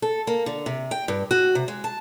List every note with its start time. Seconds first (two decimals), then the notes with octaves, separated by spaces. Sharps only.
0.02 A4
0.27 A#3
0.46 D3
0.66 C3
0.91 G5
1.08 G2
1.31 F#4
1.55 C3
1.68 G#3
1.84 A5